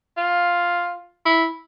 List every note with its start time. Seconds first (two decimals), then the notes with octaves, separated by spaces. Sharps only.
0.17 F4
1.26 E4